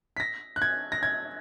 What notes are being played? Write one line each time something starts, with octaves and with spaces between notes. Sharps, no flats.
B6
A#6
F#6
G#6
A#6
G#6